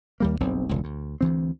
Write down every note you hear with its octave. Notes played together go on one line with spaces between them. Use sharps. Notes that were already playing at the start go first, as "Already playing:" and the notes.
D#2 G3 A#3
F#1 B1 G2 C4
E1 C#2
D2
D2 E3 C4